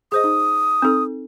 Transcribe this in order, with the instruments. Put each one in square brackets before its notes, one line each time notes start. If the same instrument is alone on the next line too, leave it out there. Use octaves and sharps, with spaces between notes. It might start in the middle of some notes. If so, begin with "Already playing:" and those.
[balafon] G#4 C5 D#5 [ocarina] D#6
[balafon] D#4
C4 D#4 A4